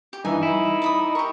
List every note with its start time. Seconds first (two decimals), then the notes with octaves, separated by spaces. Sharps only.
0.13 G4
0.25 G2 E3 D#4 G#5
0.43 E4
0.82 D5 B5 D#6
1.15 G4 A#4 C#6